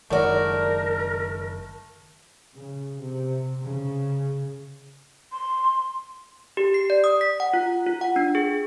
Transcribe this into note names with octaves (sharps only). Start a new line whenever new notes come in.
F#1 D#3 G#3 A3 E4 F#4 A#4 D5
C#3
C3
C#3
C6
G4
C7
D5
D#6
B6
F#5
F4
F4
F#5
D4
G#4